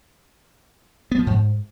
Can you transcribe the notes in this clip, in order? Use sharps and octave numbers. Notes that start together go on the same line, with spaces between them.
B3
F3
G#2